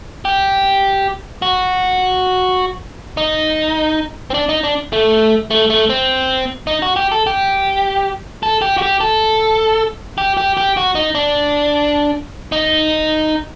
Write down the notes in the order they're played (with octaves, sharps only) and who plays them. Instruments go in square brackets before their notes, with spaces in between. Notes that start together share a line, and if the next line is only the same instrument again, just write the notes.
[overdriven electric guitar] G4
F#4
D#4
C4
D4
D#4
D4
A3
A3
A3
C4
D#4
F#4
G4
A4
G4
A4
G4
F#4
G4
A4
G4
G4
G4
F#4
D#4
D4
D#4